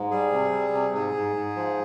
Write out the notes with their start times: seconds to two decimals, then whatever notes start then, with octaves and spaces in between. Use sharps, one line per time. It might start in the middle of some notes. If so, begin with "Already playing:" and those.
Already playing: G#2
0.11 G3 G#4
0.32 C3
0.52 G3
0.73 C3
0.94 G#2 G#4
1.15 G#2
1.36 G#2
1.56 F3